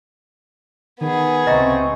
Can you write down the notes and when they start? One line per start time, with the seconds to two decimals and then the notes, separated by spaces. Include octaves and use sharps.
1.01 D#3 B3 G#4
1.47 C#2 C3 C4 D#5 E5 A#5 C#6